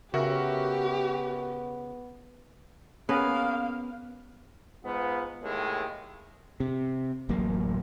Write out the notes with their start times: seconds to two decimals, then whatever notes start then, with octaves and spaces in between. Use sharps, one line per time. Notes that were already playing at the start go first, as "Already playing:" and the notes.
0.14 C#3 B3 F#4 G4 A#4 E5
3.09 A#3 B3 C#4 G#4 B4 F5
4.84 G#2 B3 F4
5.42 D#2 A2 D#3 G#3
6.60 C3
7.29 D1 A1 F#3 A#3